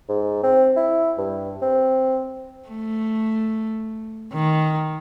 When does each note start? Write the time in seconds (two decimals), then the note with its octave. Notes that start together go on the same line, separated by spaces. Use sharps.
0.09 G#2
0.43 C4
0.76 E4
1.18 G2
1.62 C4
2.69 A3
4.33 D#3